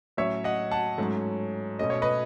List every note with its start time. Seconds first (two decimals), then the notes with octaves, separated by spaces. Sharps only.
0.17 A2 F#3 C#4 C#5 E5
0.44 D#5 F#5
0.71 F#5 A5
0.98 G#2 F#3 A3 C#4
1.79 B2 A3 C#4 D#5
1.90 C#5
2.02 B4 D#5